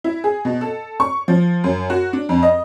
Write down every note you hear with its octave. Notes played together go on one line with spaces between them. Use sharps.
E4
G#4
B2
A4
C#6
F3
F#2
F#4
D4
F2
D#5